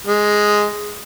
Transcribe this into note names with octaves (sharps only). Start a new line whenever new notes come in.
G#3